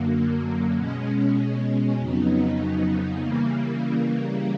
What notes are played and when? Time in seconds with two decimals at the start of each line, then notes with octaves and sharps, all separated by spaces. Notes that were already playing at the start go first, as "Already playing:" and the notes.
Already playing: F#2 D3 F#3 A#3
0.76 B2 G#3 C#4
1.98 F2 C#3 F#3 B3 D#4
3.22 C#3 E3 G3 A#3